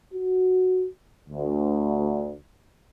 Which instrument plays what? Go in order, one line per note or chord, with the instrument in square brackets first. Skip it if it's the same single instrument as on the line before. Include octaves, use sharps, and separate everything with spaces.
[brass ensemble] F#4
D2